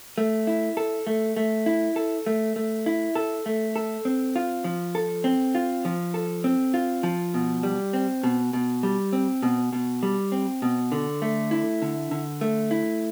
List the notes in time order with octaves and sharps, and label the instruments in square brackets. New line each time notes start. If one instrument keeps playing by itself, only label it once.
[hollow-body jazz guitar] A3
E4
A4
A3
A3
E4
A4
A3
A3
E4
A4
A3
A4
C4
F4
F3
A4
C4
F4
F3
A4
C4
F4
F3
B2
G3
C4
B2
B2
G3
C4
B2
B2
G3
C4
B2
D3
A3
E4
D3
D3
A3
E4